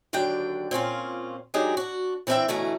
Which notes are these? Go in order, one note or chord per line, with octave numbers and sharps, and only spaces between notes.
D#2 D3 F#3 D4 G5
A#2 C4 C#4 F4
F#3 G#3 D4 D#4 G4 G#4
D4 F#4
E3 C4 D4 F#4 E5 G5
D2 B2 E3 A3 C#4 A#5